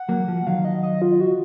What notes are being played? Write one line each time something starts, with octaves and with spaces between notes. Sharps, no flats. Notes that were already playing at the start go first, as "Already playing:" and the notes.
Already playing: F#5
F#3 A#3
F3
D#3 F#3 F5
D#5
D#5
F4
F#4